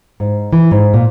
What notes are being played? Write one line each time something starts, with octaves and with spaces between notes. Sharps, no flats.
G#2
E3
G#2
A#2